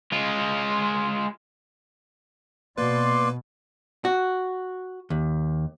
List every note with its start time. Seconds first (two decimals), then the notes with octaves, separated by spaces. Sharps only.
0.12 G#3 F4
2.78 B2 A#3 B4 D5 C6
4.05 F#4
5.10 D#2